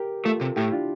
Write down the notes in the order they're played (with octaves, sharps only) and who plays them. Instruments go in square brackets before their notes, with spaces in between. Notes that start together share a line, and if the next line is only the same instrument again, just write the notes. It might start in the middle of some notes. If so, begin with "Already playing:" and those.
Already playing: [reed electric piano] G4 A#4
[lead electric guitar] A3 [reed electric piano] F4 A4
[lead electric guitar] C3
[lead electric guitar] A2 [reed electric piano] E4 G4
[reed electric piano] D4 F4